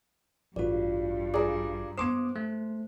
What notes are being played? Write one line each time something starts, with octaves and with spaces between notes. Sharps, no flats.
A1 G2 F4 F#4 D5
F4 G#4 D5 A#5 D6
B3 C5 C6 D6 D#6 C7 E7
A3